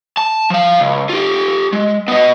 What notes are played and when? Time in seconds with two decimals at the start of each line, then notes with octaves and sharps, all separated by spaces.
0.17 A5
0.50 F3 F5
0.81 C#2
1.09 F4 G4
1.73 G#3
2.08 B3 D#5